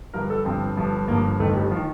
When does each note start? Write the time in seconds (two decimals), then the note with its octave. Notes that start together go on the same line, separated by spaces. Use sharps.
0.14 G1 G2 F3 A#4
0.30 A4
0.45 G1 G2 F3 C4
0.77 G1 G2 F3
1.08 G1 G2 F3 A#3
1.40 G1 F2 D#3 A3
1.55 G3
1.71 F3
1.76 D#3